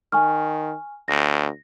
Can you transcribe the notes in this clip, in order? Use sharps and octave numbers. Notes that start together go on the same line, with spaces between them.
D#3 G#5 C#6 F6
D2 A#6